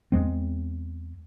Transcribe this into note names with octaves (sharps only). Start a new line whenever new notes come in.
E2 G#3 C4